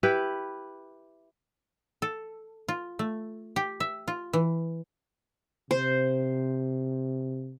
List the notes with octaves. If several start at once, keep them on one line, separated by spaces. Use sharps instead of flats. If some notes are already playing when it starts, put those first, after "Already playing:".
E4 G4 B4
A4
F4
A3
G4
E5
F4
E3
C3 C5